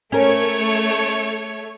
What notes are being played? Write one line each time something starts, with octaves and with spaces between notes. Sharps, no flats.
A3 C#4 A#4 C#5